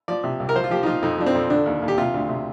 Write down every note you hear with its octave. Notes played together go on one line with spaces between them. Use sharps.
F3 D5
C3
C2
A#4
F3 C5
F4
F3 G4
D#4
F3 F4
F2 D#4
F3 D4
C4
F2
D3 D4
D#2
D#2
G4
C3 F4
D2
C3